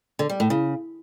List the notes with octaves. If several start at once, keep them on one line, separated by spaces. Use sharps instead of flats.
D3
G3
A2
C#3